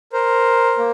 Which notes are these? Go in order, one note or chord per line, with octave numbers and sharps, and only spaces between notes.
A#4 C5
A#3